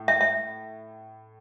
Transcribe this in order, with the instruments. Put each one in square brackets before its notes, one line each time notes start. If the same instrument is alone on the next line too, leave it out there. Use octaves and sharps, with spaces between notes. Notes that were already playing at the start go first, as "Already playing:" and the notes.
Already playing: [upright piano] A2
[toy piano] E5
E5